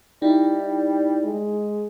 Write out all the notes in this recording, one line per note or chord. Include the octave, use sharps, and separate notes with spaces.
G3 D#4 E4
G#3